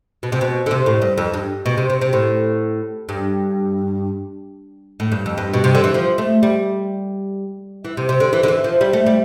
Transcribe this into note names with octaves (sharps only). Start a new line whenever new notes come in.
B2
C3
B2
D3
C3
A2
G2
F2
G2
B2
C3
C3
C3
A2
G2
A2
G2
F2
G2
B2
C3
D3
E3
F3
A3
G3
E3
C3
C3
D3
E3
D3
E3
F3
G3
A3
G3